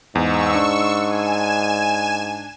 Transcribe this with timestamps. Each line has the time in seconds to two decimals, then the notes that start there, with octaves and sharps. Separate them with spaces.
0.15 E2 G#2 C#6 E6
0.55 D4
1.02 G#5 E7